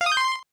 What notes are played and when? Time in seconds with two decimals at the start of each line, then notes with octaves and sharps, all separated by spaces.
0.01 F5
0.06 D#6
0.12 G6
0.17 C6